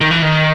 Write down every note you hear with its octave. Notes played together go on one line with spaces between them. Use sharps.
D#3
E3
D#3